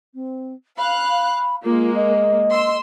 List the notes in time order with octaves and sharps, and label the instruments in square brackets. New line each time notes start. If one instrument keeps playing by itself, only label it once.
[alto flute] C4
[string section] F5 F#6 [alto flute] B5
[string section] G#3 A#3 [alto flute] F4
[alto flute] D#5
[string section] C6 E6